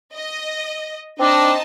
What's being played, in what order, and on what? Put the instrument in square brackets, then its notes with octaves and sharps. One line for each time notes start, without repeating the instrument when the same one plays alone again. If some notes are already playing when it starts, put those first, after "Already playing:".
[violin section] D#5
[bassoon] C4 [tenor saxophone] D4 [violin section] D#4 D#5 A5